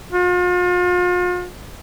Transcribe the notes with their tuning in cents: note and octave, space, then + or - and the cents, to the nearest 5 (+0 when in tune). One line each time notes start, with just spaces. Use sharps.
F4 +40